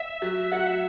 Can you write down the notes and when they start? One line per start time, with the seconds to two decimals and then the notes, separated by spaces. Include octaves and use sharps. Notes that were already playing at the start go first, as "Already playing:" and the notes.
Already playing: E5
0.22 F#3
0.52 F#3 F#5
0.67 E5